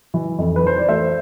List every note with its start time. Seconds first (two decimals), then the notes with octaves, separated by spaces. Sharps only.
0.14 E3
0.38 F2
0.56 B4
0.63 E3 C5
0.78 D5
0.88 A3 C5 E5